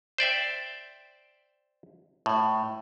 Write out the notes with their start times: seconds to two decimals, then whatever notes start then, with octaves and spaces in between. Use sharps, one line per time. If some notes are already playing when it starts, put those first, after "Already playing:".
0.18 C5 D5 E5 G5
2.26 A2